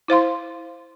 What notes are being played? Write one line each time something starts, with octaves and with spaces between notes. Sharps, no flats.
E4 C5 F5 C6